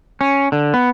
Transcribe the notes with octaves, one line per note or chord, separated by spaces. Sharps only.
C#4
D3
B3